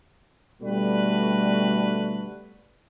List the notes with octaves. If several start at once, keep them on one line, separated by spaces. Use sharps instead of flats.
B2 D3 G3 A3 F#4 B4